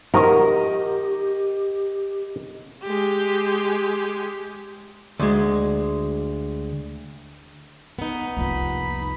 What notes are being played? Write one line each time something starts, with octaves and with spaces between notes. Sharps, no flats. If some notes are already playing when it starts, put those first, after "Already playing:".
D#3 F3 F#4 G4 A#4 D#5
G#3 G4
D2 G#3
B3 D#4
F1 C2 F3 A#3 F4 B5